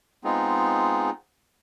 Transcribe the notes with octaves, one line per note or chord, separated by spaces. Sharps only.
G#3 B3 C4 D#4 F4 G#4